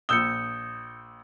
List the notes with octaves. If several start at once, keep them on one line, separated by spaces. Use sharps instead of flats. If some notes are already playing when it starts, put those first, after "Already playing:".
A#1 D#6 E6 G6 C#7 G7